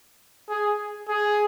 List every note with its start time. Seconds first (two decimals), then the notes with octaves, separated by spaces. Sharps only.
0.49 G#4
1.08 G#4